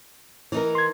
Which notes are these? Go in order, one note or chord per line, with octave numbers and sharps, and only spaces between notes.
E3 D#4 A#4
C6 G#6